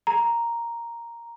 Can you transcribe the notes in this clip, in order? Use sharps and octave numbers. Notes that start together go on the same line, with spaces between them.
A#5